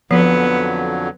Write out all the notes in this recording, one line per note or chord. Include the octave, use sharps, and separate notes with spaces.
F2 D3 F3 F#3 B3